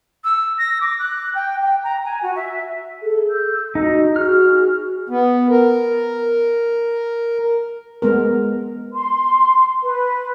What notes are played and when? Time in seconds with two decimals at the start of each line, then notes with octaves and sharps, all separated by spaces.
0.24 E6
0.58 A#6
0.81 D6
0.99 F#6
1.35 G5
1.62 G5
1.84 A#5
2.05 G#5
2.22 F#4
2.36 E5
3.02 G#4 A4
3.29 E6 G6
3.75 D#4 F#4
4.16 F#4 G#4 F6
5.10 B3
5.50 A#4
8.02 G#3 B3 A#4
8.94 C6
9.84 B4